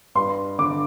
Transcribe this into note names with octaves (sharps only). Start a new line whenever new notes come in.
G2 C6
D3 D6